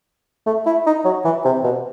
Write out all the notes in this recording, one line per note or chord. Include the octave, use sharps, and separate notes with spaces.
A3
E4
D#4
F#3
E3
C3
B2